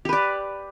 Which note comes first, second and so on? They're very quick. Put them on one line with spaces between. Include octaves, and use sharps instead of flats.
G4 B4 D5